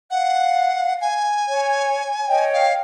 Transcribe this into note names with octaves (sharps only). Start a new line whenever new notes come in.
F5 F#5
G#5
C#5
C#5 D#5 G5
F5